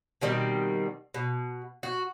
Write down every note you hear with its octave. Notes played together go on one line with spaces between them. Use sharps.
B2 D#3 G3 C4
B2
F#4